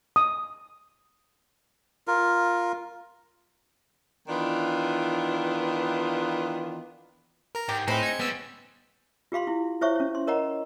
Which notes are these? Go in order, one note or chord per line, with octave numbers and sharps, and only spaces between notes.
D#6
F4 A#4
D#3 E3 B3 D4 F4
A#4 A#5
G#2 G4
A2 G#3 C4 D#4 B5
G#6 C#7
G3 B3 C#4 E6
F4 G4 F5 B5 C6
E4
E4 C5 C#5 E5 C#6
C#4 C#5
C6
A#4 C#5 D#5 F#5 A#5